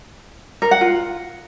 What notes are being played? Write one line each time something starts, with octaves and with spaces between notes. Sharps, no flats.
A#4
F#5
F4